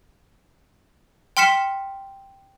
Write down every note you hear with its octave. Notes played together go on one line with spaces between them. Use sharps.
G5 C6 F6 B6 C#7 E7